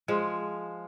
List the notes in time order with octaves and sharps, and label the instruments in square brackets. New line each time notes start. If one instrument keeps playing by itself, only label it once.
[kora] F3 G#3